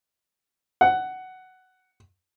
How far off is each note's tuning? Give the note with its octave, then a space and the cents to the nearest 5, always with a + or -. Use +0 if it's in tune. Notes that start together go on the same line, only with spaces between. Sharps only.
F#5 +10